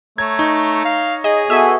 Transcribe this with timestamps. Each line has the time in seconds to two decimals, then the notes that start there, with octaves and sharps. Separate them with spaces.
0.18 A3 C#5 A#5 G#6
0.39 D#4
0.85 F5
1.24 G#4 D#5
1.50 B3 F#4 A4 E5 G#5